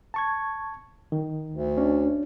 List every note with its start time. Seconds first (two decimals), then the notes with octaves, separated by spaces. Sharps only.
0.14 A5 C#6 G#6
1.12 D#3
1.50 D2
1.78 C#4 D4